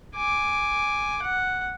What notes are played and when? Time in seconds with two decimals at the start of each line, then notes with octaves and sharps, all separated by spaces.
0.15 G#5 D6
1.22 F#5